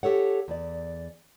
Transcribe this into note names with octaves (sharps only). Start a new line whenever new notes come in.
G4 A4 C#5 F#5
E2 D5